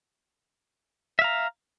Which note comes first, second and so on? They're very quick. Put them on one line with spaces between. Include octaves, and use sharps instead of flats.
E5 F5 A#5